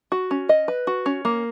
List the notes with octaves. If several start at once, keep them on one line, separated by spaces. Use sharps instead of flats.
F#4
C#4
D#5
B4
F#4
C#4
A#3